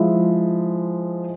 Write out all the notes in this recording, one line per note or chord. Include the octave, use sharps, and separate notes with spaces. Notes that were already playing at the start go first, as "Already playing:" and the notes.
Already playing: F3 G#3 E4